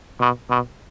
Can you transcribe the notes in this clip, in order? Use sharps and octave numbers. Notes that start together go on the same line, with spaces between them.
B2
B2